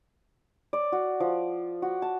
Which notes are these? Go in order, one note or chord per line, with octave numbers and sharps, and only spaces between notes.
D5
F#4
F3
F#4
A5